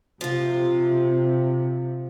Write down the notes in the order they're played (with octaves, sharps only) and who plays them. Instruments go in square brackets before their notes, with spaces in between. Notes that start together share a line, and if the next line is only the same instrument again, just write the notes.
[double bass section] C3 [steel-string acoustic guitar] F3 F4